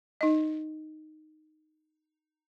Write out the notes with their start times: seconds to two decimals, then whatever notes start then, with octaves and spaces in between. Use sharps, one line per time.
0.21 D#4 D#5